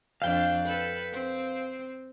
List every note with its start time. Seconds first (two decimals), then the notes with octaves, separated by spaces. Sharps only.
0.22 F2 D4 F5 G5
0.64 A4 B4
1.12 C4